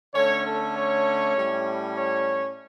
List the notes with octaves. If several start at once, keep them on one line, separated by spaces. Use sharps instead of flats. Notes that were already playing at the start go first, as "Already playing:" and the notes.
D3 A3 C#4 C#5
A4
C#5
A2 G3 C#4
C#5